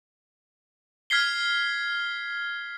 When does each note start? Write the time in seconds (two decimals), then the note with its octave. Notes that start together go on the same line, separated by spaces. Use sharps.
1.10 F6 G#6 B6 C7 G7